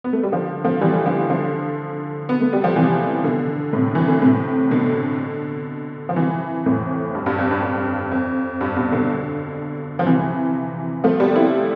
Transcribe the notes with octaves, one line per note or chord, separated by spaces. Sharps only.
B3
A3
G3
D3 F3
F3 A3
E3 G3
D3 F3
D3 F3
B3
A3
G3
F3
C3 E3
B2 D3
A2 C3
E3
D3
A2 C3
B2 D3
F3
C3 E3
F2 A2
G2
G2
F2
G2
G2
F2
G2
G2 B2
B2 D3
F3
C3 E3
F3 A3
G3 B3
C4 E4